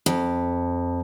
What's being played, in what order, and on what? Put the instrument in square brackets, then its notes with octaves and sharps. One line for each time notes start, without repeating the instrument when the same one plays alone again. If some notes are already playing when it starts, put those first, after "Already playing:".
[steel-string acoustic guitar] F2